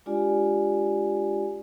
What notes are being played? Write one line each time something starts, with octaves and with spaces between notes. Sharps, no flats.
G#3 D4 F4 G4 D5 G#5